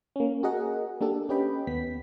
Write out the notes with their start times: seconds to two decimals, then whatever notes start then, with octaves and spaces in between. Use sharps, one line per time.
0.16 A#3 C#4
0.43 F#4 G#4 A#4 D#5 F#5
1.01 A#3 D4 G4 A4
1.29 C#4 G4 B4 D#5 G5 B5
1.67 D#2 B3 B6